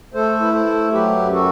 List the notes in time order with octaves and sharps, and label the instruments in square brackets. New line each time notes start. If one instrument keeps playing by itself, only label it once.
[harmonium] A3 A4 C5
E4 B4
A4 C5
A3
F#3 G4 B4
F#2
F#4 A4